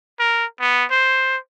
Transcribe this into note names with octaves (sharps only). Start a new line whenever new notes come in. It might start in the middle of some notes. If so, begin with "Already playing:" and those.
A#4
B3
C5